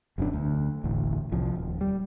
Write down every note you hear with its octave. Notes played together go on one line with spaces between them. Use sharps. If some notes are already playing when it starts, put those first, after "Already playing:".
E1 F#2 D3 D4
D2
E1 A1 D2
C2 F3
D#1
G3